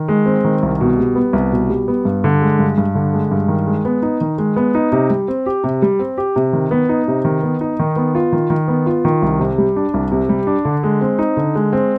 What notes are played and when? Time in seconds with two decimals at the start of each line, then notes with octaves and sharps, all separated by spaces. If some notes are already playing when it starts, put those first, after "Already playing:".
Already playing: D#3
0.08 G#3
0.26 C4
0.44 D#3
0.63 C2
0.81 B2
0.99 G3
1.15 B3
1.33 C2
1.52 B2
1.70 G3
1.88 B3
2.05 G2
2.24 D3
2.42 G#3
2.59 G2
2.78 G2
2.95 D3
3.13 G#3
3.32 G2
3.48 D#3
3.67 G#3
3.85 B3
4.02 D#4
4.21 D#3
4.38 G#3
4.56 B3
4.75 D#4
4.92 C3
5.10 G3
5.28 C4
5.46 G4
5.64 C3
5.82 G3
5.99 C4
6.18 G4
6.36 C3
6.53 D#3
6.71 B3
6.89 D#4
7.08 C3
7.25 D#3
7.43 B3
7.61 D#4
7.79 D#3
7.96 B3
8.15 F4
8.32 D#3
8.50 D#3
8.68 B3
8.86 F4
9.05 D#3
9.22 C2
9.39 C3
9.58 G3
9.76 D4
9.94 C2
10.12 C3
10.29 G3
10.47 D4
10.65 D3
10.83 G#3
11.01 C4
11.19 D#4
11.37 D3
11.55 G#3
11.73 C4